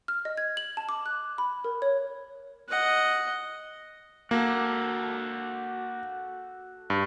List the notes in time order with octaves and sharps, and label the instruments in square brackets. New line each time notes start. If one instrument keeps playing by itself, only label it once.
[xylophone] F6
D#5
G#6
F#7
A5
D6
F#6
B5
A#4
C#5
[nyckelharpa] D#5 F#5
[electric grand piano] A#3 [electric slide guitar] F#4 A4
[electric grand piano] G2